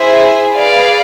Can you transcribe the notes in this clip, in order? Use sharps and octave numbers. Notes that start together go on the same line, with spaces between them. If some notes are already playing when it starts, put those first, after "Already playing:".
Already playing: E4 G#4 C5 E5 G#5
G#4 B4 D5 F5